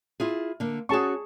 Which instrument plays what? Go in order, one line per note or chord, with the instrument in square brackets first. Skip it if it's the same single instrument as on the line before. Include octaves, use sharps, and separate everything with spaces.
[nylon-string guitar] E4 F4 G#4
D3 A#3
[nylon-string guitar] C#4 F#4 [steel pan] G#4 A5 C#6